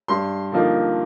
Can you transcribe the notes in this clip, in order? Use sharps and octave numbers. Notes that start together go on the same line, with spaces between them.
G2 C6
D3 F3 A#3 D#4